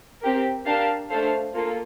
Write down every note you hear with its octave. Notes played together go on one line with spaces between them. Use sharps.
C4 G4 A#4
D4 G4 A#4 F5 A5
A3 D4 A4 C5 F5
A#3 F4 A4